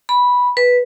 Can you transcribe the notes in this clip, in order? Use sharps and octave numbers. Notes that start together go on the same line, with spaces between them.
B5
B4